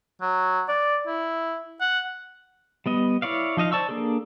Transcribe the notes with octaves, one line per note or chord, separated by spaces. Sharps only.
F#3
D5
E4
F#5
G3 B3 D#5
E4 C#5 D5 F5
F3 D#4 D#5 F5
C5 D5 A5 C#6 E6
A#3 D4 G#4 A4